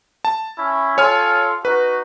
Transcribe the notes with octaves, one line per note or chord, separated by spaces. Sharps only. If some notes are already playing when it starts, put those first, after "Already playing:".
A5
C#4 E4
F4 A4 C#5 G#5 F6
D#4 F#4 B4